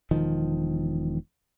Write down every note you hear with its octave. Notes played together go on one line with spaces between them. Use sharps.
E1 D#3 F3